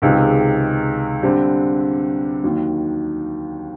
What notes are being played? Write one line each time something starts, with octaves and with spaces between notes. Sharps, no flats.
C#2 C3 D#3 G#3
D3 G3 C4
D#2 D#3 F#3